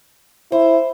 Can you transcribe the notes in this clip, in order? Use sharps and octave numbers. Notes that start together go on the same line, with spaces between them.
E4 C5